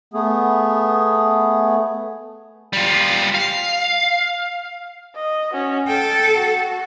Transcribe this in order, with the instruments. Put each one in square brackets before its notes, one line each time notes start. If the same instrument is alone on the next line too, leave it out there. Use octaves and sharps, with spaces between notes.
[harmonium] A3 B3 G#4
[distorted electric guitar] G3 F4
F5
[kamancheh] D#5
C#4 F#4
[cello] A4 [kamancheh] G5
[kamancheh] F#4